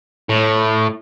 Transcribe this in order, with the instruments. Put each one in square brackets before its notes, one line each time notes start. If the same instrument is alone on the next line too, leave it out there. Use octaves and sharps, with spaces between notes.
[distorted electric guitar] A2